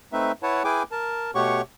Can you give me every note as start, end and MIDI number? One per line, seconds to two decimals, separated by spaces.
0.13 0.32 57
0.13 0.32 60
0.13 0.32 63
0.13 0.32 71
0.13 0.32 76
0.43 0.63 64
0.43 0.63 71
0.43 0.63 73
0.43 0.63 78
0.43 0.63 81
0.64 0.83 64
0.64 0.83 68
0.64 0.83 71
0.64 0.83 79
0.64 0.83 80
0.64 0.83 86
0.92 1.31 70
0.92 1.31 81
1.35 1.61 47
1.35 1.61 57
1.35 1.61 67
1.35 1.61 73
1.35 1.61 78
1.35 1.61 85